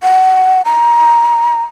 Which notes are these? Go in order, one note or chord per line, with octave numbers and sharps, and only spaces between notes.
F#5
A#5